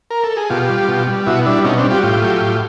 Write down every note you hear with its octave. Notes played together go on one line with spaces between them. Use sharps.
A#4
A4
G#4
B2 F4 G4
G3
B2
G3
B2 E4 F#4
G3 D4 E4
B2 C#4 D#4
C4 D4
G3
F4 G4
F#4
A2 F4 G4
F#3 A3
A2